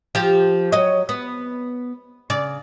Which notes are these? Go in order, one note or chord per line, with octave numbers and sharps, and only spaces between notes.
F3 G4
F#3 C#5 D#5
B3
C#3 D5